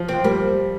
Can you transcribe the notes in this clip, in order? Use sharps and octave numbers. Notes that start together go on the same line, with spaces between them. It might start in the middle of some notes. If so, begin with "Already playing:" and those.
Already playing: F3
C4
F3
G3 A#3